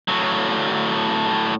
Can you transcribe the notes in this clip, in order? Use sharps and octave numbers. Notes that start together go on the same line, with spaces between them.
A2 F#3